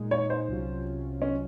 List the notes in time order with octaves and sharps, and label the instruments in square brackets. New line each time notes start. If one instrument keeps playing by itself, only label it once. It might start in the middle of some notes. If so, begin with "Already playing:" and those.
Already playing: [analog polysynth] A#2 G#3 D#4
[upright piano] C#5
C5
[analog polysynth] C2 C3 F#3 C#4 F4
[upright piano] C#4